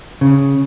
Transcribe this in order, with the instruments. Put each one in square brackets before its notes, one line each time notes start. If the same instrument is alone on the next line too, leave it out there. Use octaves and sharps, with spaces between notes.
[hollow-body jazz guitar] C#3